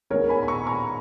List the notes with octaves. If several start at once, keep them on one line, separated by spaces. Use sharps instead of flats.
D#3 G#3 B3 A#4 C#5
G#5 B5
B5
A#5 C#6
B5
A#5 C#6